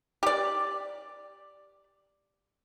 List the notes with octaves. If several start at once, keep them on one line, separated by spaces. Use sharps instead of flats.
G4 D5